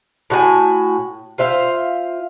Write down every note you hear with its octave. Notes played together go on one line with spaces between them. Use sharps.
A2 F#4 G4 G#5
F4 C5 E5 F5